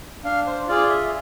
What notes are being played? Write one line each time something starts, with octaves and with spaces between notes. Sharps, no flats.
D4 F5
C5
F4 G#4 D5
E5